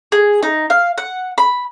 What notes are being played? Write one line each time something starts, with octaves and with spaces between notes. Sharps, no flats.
G#4
D#4
F5
F#5
B5